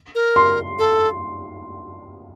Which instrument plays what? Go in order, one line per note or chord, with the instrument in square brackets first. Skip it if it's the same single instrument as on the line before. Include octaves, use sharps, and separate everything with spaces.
[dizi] A#4
[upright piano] C6
[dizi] A4